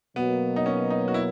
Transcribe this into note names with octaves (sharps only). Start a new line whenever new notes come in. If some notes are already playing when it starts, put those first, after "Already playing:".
B2 F#3 A#3 B3
D#4
C#4
D#4
F#4
E4